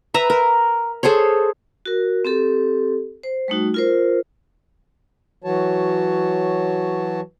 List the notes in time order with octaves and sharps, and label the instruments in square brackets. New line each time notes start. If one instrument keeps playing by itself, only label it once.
[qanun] B4 E5 A#5
A#4
G#4 A4 C5 C#5
[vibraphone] F#4 A#4
C4 G4 A4
C5
G3 A3 D#4 F#4
F4 A#4 C5
[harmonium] E3 F#3 F#4 C#5 A5